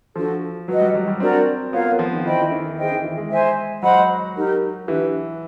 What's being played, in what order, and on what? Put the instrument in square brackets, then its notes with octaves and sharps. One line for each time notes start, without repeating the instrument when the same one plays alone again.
[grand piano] F3 [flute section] D4 F#4 A4
[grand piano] F#3 [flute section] F#4 B4 D#5
[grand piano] G3
F#3
G3
[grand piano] C4 [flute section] D4 F#4 A#4 D5
[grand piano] B3 [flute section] F4 A#4 C#5 F5
[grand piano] B3
F3
D#3
[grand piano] E3 [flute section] C5 D#5 G5 B5
[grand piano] E3
D#3
[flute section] G#4 C5 D#5 G5
[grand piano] D#3
E3
G#3
[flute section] C5 E5 G#5
[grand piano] F#3 [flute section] C5 D#5 F#5 B5
[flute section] D#4 G4 A#4
[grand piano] E3 [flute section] D4 G4 B4